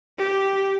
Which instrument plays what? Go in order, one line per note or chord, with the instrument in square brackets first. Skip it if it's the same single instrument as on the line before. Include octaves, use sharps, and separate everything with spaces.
[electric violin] G4